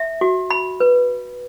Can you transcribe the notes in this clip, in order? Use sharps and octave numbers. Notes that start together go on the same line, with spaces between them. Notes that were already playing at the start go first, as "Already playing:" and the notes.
Already playing: E5
F#4
B5
B4